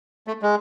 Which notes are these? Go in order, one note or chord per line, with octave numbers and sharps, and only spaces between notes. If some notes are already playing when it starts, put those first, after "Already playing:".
A3
G#3